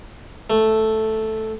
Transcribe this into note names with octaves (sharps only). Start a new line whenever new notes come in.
A3